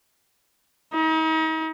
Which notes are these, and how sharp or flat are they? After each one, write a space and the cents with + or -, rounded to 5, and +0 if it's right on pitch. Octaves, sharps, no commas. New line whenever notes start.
D#4 +40